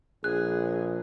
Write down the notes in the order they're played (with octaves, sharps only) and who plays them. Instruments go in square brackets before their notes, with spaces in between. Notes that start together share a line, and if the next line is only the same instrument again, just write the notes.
[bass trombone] A#1 [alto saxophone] G#4 [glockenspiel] F#6